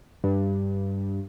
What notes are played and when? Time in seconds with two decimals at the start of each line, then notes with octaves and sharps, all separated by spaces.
0.24 G2